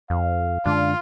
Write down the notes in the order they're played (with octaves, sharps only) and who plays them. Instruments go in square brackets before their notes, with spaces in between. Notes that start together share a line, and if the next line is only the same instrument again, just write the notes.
[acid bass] F2 [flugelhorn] F5
[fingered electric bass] F#2 D3 G#3 [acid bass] D4 [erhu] F4